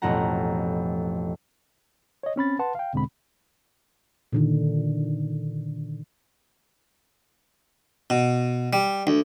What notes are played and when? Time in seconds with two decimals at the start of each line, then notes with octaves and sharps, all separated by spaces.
0.02 A1 F2 B2 F#5 A#5
2.23 C#5 D#5
2.36 C4 C#4 B5 A6
2.59 B4 F#5 A5 C6
2.75 F5 G5
2.93 E2 B2 D3 G#3 C4 B5
4.33 A#2 D3 D#3
8.10 B2
8.73 G3
9.07 D2